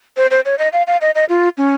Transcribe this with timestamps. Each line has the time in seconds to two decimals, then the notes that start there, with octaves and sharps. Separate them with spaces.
0.17 C5
0.31 C5
0.45 C#5
0.59 D#5
0.73 F5
0.87 F5
1.01 D#5
1.15 D#5
1.29 F4
1.58 C#4